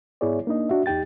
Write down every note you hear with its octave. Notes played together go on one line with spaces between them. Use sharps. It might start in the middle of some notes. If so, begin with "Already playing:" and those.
G#2 B3 E4 G#4 C#5 D5
A#3 D4 D#4 D#5
D4 F#4 E5
E2 D#4 G4 G5 A6